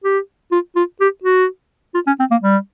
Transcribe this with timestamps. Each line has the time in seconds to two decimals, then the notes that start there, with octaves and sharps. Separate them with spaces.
0.04 G4
0.51 F4
0.76 F4
1.00 G4
1.24 F#4
1.94 F4
2.07 C#4
2.19 C4
2.31 A#3
2.42 G3